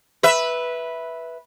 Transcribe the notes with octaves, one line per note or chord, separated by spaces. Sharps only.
B4 E5